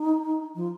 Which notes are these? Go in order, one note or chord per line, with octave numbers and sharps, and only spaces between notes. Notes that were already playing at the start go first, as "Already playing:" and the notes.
Already playing: D#4
F3